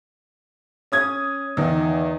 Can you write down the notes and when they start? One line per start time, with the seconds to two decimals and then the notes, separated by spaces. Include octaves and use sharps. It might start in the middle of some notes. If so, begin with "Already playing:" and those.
0.92 C#4 D#6 G#6
1.57 E2 D#3